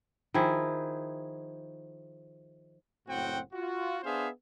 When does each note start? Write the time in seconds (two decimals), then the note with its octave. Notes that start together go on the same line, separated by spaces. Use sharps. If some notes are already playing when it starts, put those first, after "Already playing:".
0.34 D#3 F3 E4 G#4
3.07 F#1 A2 C4 F#4 F#5 G5
3.53 F4 F#4
4.03 B3 D4 G#4 C5 E5 F5